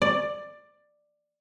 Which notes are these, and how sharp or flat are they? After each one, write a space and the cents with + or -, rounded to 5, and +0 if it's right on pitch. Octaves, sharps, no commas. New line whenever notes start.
D5 +10